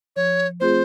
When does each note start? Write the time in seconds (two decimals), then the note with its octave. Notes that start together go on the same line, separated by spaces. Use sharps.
0.16 F3 C#5
0.60 A3 C4 F4 G#4 C5